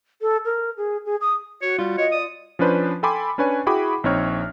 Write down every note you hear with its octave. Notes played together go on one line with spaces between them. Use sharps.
A4
A#4
G#4
G#4
D#6
F#4 C#5
G3 F4
C#5 D#5
D5 D#6
F3 C#4 D4 B4 C5
A4 G5 G#5 B5 C6 D6
C#4 D4 B4 C#5 G#5
E4 F#4 G#4 G5 B5 D6
A#1 C4 D#4 C#5 F6